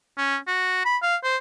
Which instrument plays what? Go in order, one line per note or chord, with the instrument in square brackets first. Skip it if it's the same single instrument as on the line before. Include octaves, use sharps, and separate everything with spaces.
[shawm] C#4
F#4
B5
F5
C5